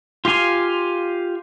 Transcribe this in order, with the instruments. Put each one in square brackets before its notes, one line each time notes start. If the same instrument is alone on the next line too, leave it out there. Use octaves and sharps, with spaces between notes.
[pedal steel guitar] F4 G4 F5 G#5